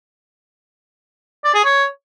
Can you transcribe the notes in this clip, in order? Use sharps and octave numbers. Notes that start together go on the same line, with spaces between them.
D5
G#4
C#5